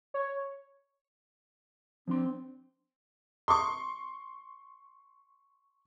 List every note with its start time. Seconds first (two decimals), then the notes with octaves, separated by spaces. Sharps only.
0.14 C#5
2.08 F3 C4 D4 C6
3.48 C6 C#6